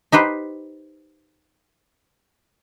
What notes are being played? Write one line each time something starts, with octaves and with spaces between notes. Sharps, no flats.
D#4 G4 B4 C5